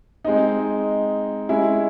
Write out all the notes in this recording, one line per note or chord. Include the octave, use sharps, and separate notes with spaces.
G#3 C4 D#4
G#3 C#4 E4